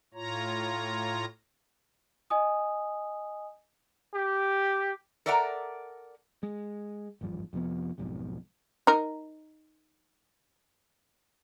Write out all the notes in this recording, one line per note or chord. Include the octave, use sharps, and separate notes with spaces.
A2 F4 C#5 A#5
D#5 G#5 D#6
G4
A4 A#4 D5 E5 F#5 A#5
G#3
G#1 E2 G2 F3
F2 C3 F3 B3
B1 F2 G#2 B2
D#4 A#4